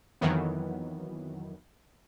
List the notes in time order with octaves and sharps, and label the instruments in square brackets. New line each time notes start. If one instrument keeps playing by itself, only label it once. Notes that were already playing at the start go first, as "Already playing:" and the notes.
[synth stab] F2 D#3 E3 F#3 B3